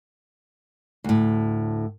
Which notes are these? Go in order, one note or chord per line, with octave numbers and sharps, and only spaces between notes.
D2 A2